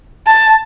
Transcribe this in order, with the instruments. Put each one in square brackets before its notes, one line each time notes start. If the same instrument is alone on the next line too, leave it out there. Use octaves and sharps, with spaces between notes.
[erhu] A5